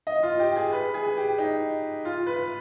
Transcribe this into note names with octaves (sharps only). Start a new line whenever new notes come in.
D#5
F4
G4
G#4
B4
G#4
G4
D#4
F4
B4